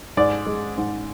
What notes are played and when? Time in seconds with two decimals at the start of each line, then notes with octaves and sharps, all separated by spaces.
0.17 G#2 D5
0.46 G#3
0.77 G#2